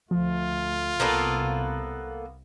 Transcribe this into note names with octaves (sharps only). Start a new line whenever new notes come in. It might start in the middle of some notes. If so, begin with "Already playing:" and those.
D2 F3 A3 F4
C2 C3 A#3 B3 A4